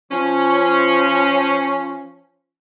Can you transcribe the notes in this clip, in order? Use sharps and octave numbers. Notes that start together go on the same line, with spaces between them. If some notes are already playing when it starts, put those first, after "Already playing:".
F3 C#4